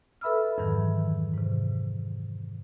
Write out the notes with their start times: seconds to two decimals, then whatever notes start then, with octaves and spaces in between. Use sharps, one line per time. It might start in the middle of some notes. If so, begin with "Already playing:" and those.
0.21 A4 B4 E5 B5 E6 F6
0.58 F2 G#2 D#3 E3 F#3
1.34 G#2 C3